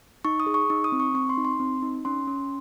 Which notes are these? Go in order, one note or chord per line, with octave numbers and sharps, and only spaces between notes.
D#4 C#6
D#6
G#4
C#6
D#4 C#6
D#6
C4
C#6
C4 C#6
C6
D#4
C6
C4
D#4
C#4 C6
C#4